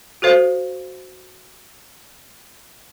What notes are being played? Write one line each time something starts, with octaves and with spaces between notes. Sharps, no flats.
F#4 A4 C5 F5